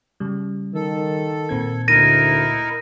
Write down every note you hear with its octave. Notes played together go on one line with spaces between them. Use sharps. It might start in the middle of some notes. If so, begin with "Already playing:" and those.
C#3 G3
D#3 A4
A#2 C4 G#6
D2 D#4 E4 A#4 A#6 D#7